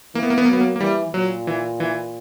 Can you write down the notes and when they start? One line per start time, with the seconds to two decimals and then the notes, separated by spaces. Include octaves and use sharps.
0.15 E3 A#3
0.23 B3
0.30 A#3
0.38 B3
0.45 A#3
0.48 F#3 B3
0.61 A#3
0.76 A#3
0.80 E3 G3
1.13 A#2 F#3
1.47 E3
1.80 E3